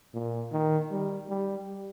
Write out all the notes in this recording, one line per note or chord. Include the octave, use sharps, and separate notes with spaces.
A#2
D#3
G3
G3